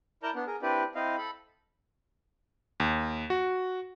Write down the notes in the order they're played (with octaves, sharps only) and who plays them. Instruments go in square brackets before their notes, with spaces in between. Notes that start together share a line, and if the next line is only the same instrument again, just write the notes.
[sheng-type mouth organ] E4 A#4 D5 A5 A#5 G6
B3 D4
G#4 A#4
C4 D4 E4 G4 B4 D5
C4 E4 D#5 F5
A4 B5
[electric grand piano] D#2
F#4